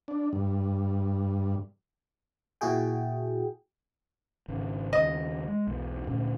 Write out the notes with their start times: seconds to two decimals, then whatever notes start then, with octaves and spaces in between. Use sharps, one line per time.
0.08 D4
0.33 G2
2.61 A#2 E4 F#4 G#4 G5
4.48 G#1 C#3
4.93 D#2 C#3 D#5
5.48 G#3
5.67 B1 E2
6.07 D2 A#2 C#4